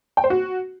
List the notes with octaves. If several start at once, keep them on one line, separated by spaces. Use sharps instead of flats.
G5
C5
F#4